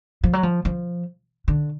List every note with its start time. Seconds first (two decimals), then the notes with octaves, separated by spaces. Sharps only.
0.24 F3
0.33 F#3
0.43 F3
0.65 F3
1.48 D3